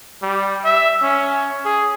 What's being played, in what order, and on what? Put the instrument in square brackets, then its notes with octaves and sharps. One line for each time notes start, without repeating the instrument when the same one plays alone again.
[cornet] G3
E5
C#4
G#4